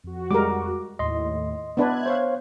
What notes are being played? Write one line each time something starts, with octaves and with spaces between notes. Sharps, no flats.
F2 F#4
G3 G#3 A#4 D6
D#2 A2 D#5 C6
B3 D4 B4 E5 F#6 G#6
C5 C#5 F5